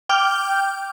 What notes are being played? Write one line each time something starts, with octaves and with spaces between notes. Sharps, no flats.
G5 D6 F6 G6